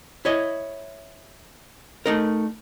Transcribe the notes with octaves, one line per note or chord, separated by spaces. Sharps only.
E4 C#5 D#5
A3 D#4 A#4